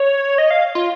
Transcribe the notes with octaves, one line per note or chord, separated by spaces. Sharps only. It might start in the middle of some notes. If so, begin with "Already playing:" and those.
Already playing: C#5
D#5
F5
F4